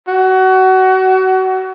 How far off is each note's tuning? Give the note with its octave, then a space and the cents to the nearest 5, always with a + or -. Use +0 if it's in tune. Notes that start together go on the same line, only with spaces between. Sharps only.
F#4 +25